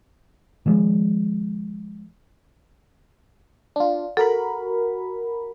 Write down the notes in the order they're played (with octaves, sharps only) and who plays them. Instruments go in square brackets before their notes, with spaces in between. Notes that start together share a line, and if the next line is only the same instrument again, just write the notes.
[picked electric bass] D#3 F3 G#3
[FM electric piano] D4 F4
[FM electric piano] F#4 A#4 B5 [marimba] A4